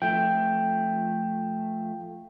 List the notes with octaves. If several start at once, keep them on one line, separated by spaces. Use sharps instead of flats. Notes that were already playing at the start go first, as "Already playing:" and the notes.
F3 A3 G5